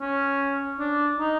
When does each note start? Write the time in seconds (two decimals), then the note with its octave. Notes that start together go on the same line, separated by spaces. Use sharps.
0.01 C#4
0.80 D4
1.19 D#4